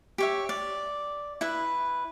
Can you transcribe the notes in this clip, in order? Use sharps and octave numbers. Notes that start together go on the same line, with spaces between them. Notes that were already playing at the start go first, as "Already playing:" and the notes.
G4 C#5 E5
D5
E4 B4